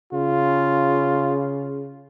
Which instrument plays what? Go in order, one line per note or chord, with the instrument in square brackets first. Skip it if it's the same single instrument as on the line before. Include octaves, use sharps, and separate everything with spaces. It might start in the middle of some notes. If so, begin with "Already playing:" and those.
[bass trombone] C#3 [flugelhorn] F4